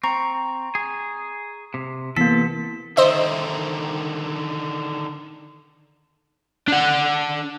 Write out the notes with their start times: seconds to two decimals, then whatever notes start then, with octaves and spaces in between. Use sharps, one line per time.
0.03 C4 A#5 C#6
0.75 G#4
1.74 C3
2.16 C3 E3 A#3 B3 A4 B6
2.97 D3 D#3 C5 D#5 E5
6.68 D4 F#5